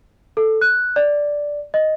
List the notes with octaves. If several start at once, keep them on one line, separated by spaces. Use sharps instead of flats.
A4
F#6
D5
D#5